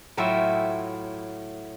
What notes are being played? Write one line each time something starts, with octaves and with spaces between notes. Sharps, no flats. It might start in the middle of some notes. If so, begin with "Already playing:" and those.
A2 F#3 E4 F4 E5 G5